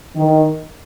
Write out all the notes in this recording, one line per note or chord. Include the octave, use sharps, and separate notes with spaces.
D#3